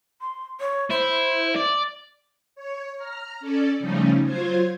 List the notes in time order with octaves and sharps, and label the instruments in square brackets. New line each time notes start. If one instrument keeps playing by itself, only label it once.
[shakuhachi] C6
C#5
[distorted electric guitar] E4 [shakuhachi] C5
[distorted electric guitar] D5
[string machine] C#5
A#5 F6
C#4 A4 D5
C#3 F3 G3 A3 C#4 D#4
F#3 F4 C5 G#6